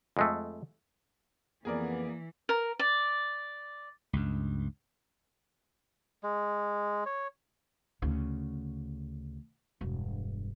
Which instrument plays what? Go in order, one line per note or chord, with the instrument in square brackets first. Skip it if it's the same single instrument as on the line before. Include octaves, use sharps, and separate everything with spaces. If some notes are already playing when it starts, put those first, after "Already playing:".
[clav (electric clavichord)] F2 G#3 A3
[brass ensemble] F2 B3 [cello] E3 [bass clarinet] A#3 [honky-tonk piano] G#4 A#4 D5
[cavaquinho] A#4
D5
[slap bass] C#2 G2
[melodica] G#3
C#5
[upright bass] D2 C#3
E1 G2